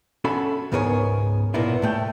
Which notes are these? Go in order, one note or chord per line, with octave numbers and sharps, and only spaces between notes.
C#4 F#4 A4 E5 B5
C#2 G#2 B3 G#4 A#4 C#5
B1 A#2 A#3 B3 E4
A2 A3 G5